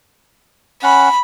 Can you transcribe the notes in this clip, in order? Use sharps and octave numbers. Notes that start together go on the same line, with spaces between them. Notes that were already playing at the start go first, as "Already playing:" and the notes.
C#4 F#5 B5